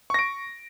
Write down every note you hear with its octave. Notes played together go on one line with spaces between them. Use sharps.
C#6 A#6 D7